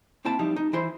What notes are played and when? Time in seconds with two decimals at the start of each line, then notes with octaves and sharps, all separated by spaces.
0.25 A#3 C4 E4 G5 A5
0.39 F3 G3 D#4 E4
0.56 D#4
0.73 E3 E4 C5 C6